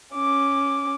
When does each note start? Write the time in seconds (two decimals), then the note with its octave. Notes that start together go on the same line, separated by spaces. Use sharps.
0.15 C#4 D6